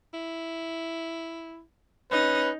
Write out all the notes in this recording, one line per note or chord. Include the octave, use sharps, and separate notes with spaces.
E4
C#4 D#4 B4